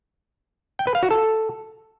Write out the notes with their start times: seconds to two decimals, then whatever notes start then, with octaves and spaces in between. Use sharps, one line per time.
0.79 G5
0.87 B4
0.95 F5
1.03 F#4
1.10 A4